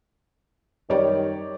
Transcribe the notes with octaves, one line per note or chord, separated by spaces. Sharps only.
F#2 D#3 G3 G4 C#5 D5